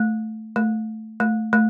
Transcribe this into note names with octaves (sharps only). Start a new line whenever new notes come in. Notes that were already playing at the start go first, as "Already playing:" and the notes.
Already playing: A3
A3
A3
A3